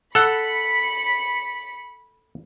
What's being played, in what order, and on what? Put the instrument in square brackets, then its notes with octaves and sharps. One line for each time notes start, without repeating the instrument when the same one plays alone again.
[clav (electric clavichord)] A4 F#5 [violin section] B5 B6 C#7